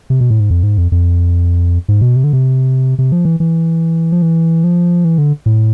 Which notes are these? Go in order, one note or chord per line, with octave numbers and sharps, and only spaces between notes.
C3
B2
A2
G#2
F2
G#2
F2
F2
G#2
B2
C3
D3
C3
C3
F3
E3
E3
F3
E3
F3
E3
D3
A2